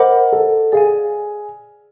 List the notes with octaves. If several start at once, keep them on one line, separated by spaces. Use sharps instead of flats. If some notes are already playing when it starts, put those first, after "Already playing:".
Already playing: A#4 C5 D#5 F#5 B5 D6
A4
G#4 D5 F5 G#5